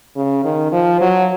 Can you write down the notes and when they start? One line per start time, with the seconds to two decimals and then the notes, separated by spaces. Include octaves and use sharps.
0.16 C#3
0.45 D#3
0.72 F3
1.01 F#3